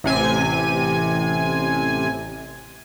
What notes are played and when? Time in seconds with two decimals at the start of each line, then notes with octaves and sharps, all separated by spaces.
0.04 A1 C3 G#5